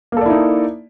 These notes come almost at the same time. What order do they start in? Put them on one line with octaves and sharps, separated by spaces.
A#3 A4 D5 E4 D#4